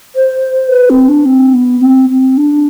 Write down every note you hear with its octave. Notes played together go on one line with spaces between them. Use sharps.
C5
B4
C4
D4
C4
B3
C4
C4
D4